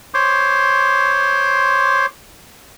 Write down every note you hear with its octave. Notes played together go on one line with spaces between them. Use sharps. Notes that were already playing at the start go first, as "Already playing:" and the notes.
C5 C#5 C6 D6